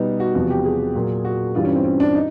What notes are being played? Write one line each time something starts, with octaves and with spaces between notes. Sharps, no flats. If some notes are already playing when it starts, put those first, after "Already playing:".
Already playing: B2 G3 B3 D#4
F#4
E2 C3 F3 F#4
G4
G#4
A#2 F#3
F#4
G2 E3 G3 F4
C#4
C4
C#4
D4
D#4